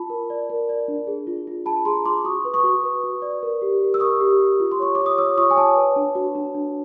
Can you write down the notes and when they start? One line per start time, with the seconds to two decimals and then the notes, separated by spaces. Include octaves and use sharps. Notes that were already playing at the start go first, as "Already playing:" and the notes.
Already playing: F4 A5 B5
0.10 A#4
0.30 D5
0.50 A#4
0.69 D5
0.88 D4
1.07 G#4
1.27 F4
1.47 F4
1.66 G#4 A5 B5
1.85 G#4 A#5 C6
2.05 F4 C6 D6
2.24 F#4 C#6 D#6
2.45 B4
2.54 C#6 D#6
2.64 F#4
2.84 B4
3.03 F#4
3.22 D5
3.43 A#4
3.62 G4
3.81 A#4
3.94 E6
4.00 A#4 C#6 D#6
4.20 G4
4.40 G4
4.60 F4
4.72 C6
4.80 C#5 C#6
4.95 F4 D6
5.06 D#6
5.18 C#5 D6 E6
5.37 F4 C#6 D#6
5.51 G#5
5.56 C#5 G5 A5
5.76 B4
5.96 D4
6.15 F#4
6.35 D4
6.55 D4